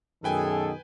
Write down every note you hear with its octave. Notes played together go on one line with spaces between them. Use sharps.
F#2 B2 D#3 G#4 A4 B4 G5 G#5